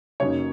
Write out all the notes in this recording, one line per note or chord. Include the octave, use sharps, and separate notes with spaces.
F#2 C#3 F#3 A#3 D#4 C#5